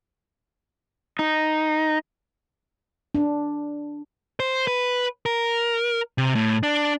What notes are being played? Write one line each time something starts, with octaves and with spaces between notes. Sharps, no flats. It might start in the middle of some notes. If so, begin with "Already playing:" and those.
D#4
D4
C5
B4
A#4
C3
A2
D4